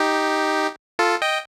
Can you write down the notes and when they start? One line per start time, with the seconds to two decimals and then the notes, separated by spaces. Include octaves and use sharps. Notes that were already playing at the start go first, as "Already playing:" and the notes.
Already playing: D#4 G4
0.99 F4 A4
1.22 D#5 G5